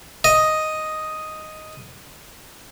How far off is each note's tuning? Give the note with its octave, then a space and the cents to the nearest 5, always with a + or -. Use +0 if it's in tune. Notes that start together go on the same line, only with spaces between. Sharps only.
D#5 +5